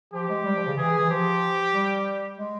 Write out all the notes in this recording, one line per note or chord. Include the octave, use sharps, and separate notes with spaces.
F3 G4
G#3
G3
F3
C#3
E3 G#4
E3
F3 G4
G3
G#3